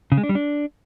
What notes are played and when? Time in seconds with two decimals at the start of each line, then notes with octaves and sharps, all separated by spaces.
0.12 C#3
0.18 G#3
0.23 D4
0.29 G3
0.35 D4